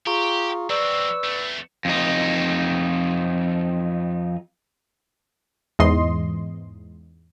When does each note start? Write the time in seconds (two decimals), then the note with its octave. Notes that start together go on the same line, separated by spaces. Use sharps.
0.07 F4 G4 G#4 A#5 C#6
0.70 F#3 C4 B4 D5 C#6 E6
1.24 E2 A3
1.85 F2 D#4
5.79 E2 G#2 D#5 C6